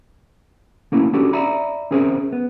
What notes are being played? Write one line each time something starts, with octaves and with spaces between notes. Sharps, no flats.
A3 A#3 C#4 E4
C#4 D4 F#4 G4 A4
D5 E5 A#5 B5
C4 C#4 G#4 A#4 C5 E5
B3